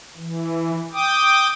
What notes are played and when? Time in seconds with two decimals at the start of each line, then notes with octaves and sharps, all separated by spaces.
0.17 E3
0.93 G5 D6 D#6